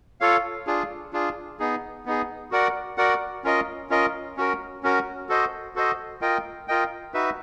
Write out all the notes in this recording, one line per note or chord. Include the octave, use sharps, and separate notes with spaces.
F4 A4 C#5 F5
D4 F4 G#4
D4 F4 G#4
B3 D#4 G#4
B3 D#4 G#4
F#4 A#4 D5 F#5
F#4 A#4 D5 F#5
C#4 F4 A#4 D#5
C#4 F4 A#4 D#5
C#4 F#4 A#4
C#4 F#4 A#4
F#4 A4 C5 D#5
F#4 A4 C5 D#5
F4 A#4 D#5 G5
F4 A#4 D#5 G5
D#4 F#4 B4 E5